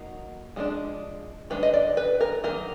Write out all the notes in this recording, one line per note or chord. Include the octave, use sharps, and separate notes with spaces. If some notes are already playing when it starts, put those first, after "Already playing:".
Already playing: F#3 A#3 D#4
F3 G#3 B3 D4
D#3 G#3 D4 B4
D#5
D5
B4
A#4
D#3 F#3 A#3 A#4